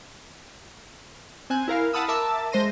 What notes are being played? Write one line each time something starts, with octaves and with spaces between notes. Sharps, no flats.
C4 C5 G#5 F#6
E4 A#4 F5
F5 F#5 A5 B5 D#6 E6
A#4 E5 A5 D6 E6
G#3 C5 C6 A#6 D#7